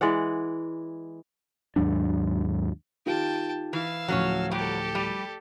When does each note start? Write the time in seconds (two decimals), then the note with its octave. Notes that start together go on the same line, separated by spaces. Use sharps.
0.01 E3 G#3 D5 F#5
1.76 D#2 G#2 F#3 D4
3.06 D#3 F4 G4 G5 A5
3.73 E3 F5 E6
4.08 D1 F3 F#3 C#4 C#5
4.51 F#3 G3 G4 A4
4.95 G3